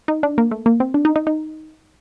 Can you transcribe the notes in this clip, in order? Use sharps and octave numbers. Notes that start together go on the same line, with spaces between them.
D#4
D4
A#3
A3
A#3
C4
D4
D#4
D#4
D#4